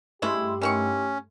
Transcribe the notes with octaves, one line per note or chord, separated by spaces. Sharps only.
G2 G#3 A3 C#4 E4 G4 C6
D#3 E3 C#4 C#6